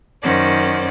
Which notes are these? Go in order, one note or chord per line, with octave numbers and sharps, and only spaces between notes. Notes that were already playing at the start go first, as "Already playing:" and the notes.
F#2 D#3 C#4 C5 D5 F#5